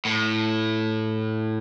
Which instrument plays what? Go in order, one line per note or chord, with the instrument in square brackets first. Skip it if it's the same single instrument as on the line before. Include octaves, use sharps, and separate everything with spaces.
[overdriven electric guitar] A2